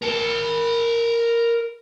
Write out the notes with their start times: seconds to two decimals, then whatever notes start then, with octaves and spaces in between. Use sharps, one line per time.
0.02 A#4 A5